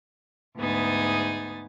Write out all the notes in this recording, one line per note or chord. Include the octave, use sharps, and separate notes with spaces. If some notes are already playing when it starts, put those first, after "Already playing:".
D2 G#2 B3 D#4 G#4 A6